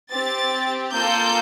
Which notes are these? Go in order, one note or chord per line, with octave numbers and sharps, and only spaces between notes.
C4 G4 A6
A#3 F4 A4 G6